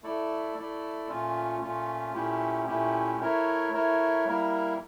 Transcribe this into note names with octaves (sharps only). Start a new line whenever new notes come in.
A3 E4 A4 D5
A3 E4 A4 D5
A#2 A3 C#4 F4
A#2 A3 C#4 F4
A#2 A3 C#4 E4 G4
A#2 A3 C#4 E4 G4
A3 E4 A#4 C#5
A3 E4 A#4 C#5
G3 A#3 E4 A#4